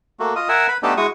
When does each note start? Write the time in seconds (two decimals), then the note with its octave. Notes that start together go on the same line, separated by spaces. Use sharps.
0.20 A3 A#3 F#4
0.36 F4 D#5 D#6
0.49 A#4 E5 F#5 G#5 E6
0.68 B4 B5
0.83 A3 B3 D4 D#4 G4 A4
0.97 G#3 E4 F#4 C#6 D#6